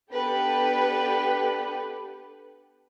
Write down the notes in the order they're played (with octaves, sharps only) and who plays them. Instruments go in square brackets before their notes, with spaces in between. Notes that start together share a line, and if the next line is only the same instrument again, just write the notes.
[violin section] B3 D4 G4 A4 B4